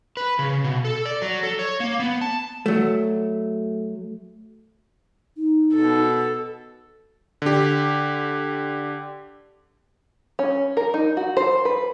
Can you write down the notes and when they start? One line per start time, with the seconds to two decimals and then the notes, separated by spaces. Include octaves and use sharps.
0.17 B4
0.39 C#3
0.64 B2
0.85 A4
1.05 D5
1.22 F#3
1.43 A4
1.59 C#5
1.80 A#3
2.00 B3
2.21 A5
2.66 F#3 A3
5.37 D#4
5.73 B2 A4
7.42 D3 G4
10.39 C#4
10.77 A#4
10.94 D#4
11.17 F#4
11.37 C5
11.65 B4